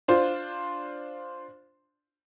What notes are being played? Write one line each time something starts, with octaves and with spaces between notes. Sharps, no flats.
D4 F4 C5